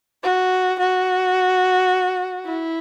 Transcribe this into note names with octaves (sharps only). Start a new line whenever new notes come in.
F#4
F#4
E4